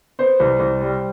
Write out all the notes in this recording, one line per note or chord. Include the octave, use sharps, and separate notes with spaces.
B3 C5
C2
C2
G3